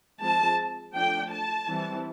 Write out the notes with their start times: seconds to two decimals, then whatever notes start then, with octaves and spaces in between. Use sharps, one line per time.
0.21 F3 G#3 C4 A5
0.95 F3 A3 D4 G5
1.32 A5
1.69 E3 G3 C4